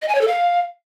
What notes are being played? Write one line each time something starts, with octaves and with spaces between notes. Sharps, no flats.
D#5
G#5
C#5
A4
F5